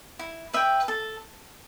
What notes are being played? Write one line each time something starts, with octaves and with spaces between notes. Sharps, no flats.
E4
B4 E5 G5
A4